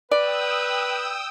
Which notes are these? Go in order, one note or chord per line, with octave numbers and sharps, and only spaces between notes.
B4 D5 G5 D#6 E6